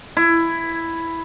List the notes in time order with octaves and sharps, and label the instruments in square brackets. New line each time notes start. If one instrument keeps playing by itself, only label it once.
[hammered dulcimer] E4